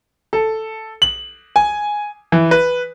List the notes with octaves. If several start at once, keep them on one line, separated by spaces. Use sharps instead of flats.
A4
F#7
G#5
E3
B4